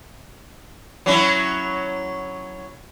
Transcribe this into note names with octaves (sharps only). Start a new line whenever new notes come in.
F#3 C#4 E4